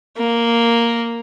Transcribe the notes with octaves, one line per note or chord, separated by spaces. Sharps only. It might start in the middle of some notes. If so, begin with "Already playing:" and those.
A#3